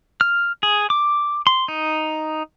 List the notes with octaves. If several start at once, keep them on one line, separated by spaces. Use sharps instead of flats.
F6
G#4
D6
C6
D#4